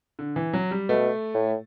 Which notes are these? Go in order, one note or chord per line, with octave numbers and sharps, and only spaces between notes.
D3
E3
F#3
G3
B2 A3
A2